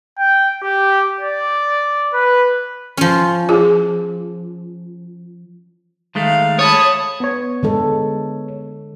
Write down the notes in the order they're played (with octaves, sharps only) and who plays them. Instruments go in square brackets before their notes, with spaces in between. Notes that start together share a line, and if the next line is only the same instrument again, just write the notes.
[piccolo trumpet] G5
G4
D5
B4
[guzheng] F3 C#4
[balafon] F4 G#4
[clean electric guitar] D#3 G#3 A3 [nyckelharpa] F5
[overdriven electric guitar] C#5 [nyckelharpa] A5 B5 [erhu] D#6
[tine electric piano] B3 C#5
[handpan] D3 G#3 A4